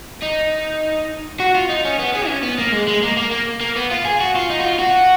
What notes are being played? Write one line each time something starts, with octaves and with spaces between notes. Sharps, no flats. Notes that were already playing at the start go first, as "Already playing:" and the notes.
D#4
F#4
F4
D#4
C#4
B3
G#4
C#4
B3
A#3
G#3
G#3
A#3
A#3
A#3
A#3
B3
F4
G#4
F#4
F4
D#4
F#4
F4
F#4